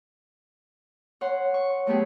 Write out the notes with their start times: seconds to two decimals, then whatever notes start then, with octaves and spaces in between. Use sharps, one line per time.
1.21 C#5 F#5 C6
1.54 C#6
1.87 F#3 A3 B3 G4 G#4